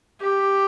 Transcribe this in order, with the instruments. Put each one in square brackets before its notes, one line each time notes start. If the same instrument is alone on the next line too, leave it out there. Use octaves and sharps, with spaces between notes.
[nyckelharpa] G4